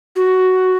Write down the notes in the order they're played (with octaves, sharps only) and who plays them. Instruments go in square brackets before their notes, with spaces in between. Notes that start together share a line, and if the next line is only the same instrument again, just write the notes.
[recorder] F#4